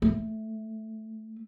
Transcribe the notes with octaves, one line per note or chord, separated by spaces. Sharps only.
A3